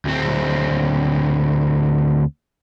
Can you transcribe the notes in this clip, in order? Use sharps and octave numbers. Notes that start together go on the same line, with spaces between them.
D2 C4